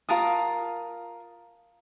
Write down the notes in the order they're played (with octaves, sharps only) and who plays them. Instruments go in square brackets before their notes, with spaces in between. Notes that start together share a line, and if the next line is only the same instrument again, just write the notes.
[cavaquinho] F4 A#4 A5 D#6